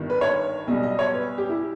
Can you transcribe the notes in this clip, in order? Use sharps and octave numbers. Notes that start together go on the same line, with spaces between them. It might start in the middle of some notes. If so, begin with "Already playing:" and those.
Already playing: G1 G2 D#3
B4
C#5
B1 B2 G3 D#5
D#5
C#5
B4
G4
E4